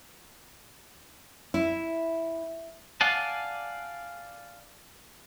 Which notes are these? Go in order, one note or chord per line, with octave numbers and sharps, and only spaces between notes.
E4
D5 F5 F#5 G#5 A5